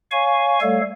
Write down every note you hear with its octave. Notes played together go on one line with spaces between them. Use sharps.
C#5 F5 G#5 C#6
G3 A3 A4 C#5 F5